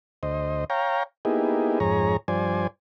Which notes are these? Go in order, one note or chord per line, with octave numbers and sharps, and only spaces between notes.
D2 C5 D#5
C#5 F5 G5 A#5
A#3 B3 D#4 E4 G4 G#4
F2 G#2 G#4 C#5 A#5
G2 F3 C5 D5 G#5